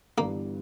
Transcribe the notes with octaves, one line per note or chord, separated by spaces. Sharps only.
G1 G2 E3 A#3